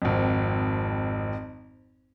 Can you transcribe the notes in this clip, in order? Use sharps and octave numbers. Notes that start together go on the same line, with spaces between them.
G#1 F2